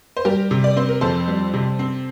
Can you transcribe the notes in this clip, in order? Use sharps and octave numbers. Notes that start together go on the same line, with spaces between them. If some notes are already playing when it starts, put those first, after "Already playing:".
C5
G3 G4 A#4
C3
D5
C4 C5
A#4
F2 A4 C5
G3
C3
C4